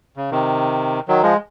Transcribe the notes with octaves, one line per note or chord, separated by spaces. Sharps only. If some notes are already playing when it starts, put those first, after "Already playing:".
C#3
C3 D#3
D#3 F#3
F3 G#3